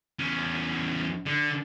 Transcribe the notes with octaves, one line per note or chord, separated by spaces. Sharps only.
E2 C#4
D3